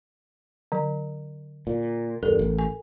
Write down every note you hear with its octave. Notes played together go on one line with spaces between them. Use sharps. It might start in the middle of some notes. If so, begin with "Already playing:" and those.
D3 F#3
A#2
E2 G2 A4 A#4
A1
G#5